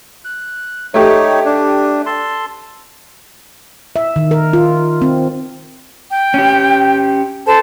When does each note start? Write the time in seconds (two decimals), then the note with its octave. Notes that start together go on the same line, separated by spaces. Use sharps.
0.25 F#6
0.94 A3 D#4 G4 C#5
1.45 D4
2.06 A4 A5 C6
3.96 E5
4.16 D#3
4.31 A#4
4.53 F4
5.02 C4
6.10 G5
6.34 C#4 G4
7.46 A4 C5 A5